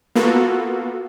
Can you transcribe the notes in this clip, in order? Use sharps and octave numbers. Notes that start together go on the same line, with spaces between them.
A#3 B3 F4 F#4 A4